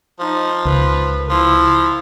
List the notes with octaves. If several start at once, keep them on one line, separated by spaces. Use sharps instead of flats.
F3 D#4
C#2 B4
F3 E4